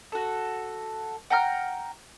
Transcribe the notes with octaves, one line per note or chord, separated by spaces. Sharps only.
F#4 A4
F#5 G5 A#5 F6